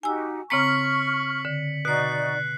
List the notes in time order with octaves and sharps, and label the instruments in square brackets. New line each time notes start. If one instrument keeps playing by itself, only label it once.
[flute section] D#4 F#4 G4 [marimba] G#5 E6
[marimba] C#3 C4 A#5 [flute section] C#6 F6 [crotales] B6 C#7 F#7
[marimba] D3
[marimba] B2 [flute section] D#4 F#4 D5 [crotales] F#6 C7